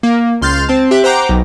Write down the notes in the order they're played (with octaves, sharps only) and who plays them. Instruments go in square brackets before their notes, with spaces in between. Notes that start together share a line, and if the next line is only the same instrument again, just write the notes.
[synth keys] A#3
C#2 C6 F6 G6 A6
C4 A5
G4 E5 F#6
C5 F#5 G5 A#5 D6
B1